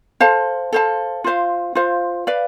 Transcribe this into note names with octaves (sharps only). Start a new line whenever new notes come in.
A4 C5 F5 A5
A4 C5 F5 A5
F4 C5 F5
F4 C5 F5
B4 D5 F5